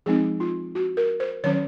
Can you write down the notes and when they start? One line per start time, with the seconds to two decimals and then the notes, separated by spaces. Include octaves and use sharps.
0.06 F3 G#3 C4 D#4 G#4
0.40 F4
0.75 F#4
0.97 A#4
1.20 C5
1.44 D#3 F#3 C#4 C#5